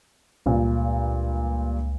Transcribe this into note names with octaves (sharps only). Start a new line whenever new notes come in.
C#2 G2 A#2